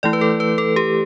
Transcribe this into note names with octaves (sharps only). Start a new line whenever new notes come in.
E3 A3 E4 D5
B4
A4
B4
A4
G4